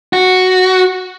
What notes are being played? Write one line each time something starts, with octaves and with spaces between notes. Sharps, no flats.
F#4